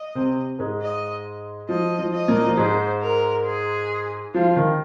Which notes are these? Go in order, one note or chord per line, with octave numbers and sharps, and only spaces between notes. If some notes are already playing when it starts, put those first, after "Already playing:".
Already playing: D#5
C3 C4
G#2 G#3
D#5
F3 D#5
F3
D#5
A#2 A#3
F3
G#2 G#3 C5
A#4
G#4
F3 F4
D#3